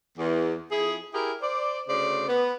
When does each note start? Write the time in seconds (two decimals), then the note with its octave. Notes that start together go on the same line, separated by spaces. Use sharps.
0.18 E2
0.71 F2 E4 G#4
1.13 E4 G4 G#4 A#4
1.42 C5 D5
1.88 D2 C#3 C5 D5
2.28 B3